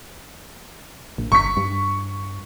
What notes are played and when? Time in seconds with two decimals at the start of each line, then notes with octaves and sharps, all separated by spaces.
1.18 A#1
1.32 G1 C#6 B6
1.57 G2